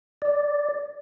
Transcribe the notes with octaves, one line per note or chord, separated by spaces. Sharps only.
D5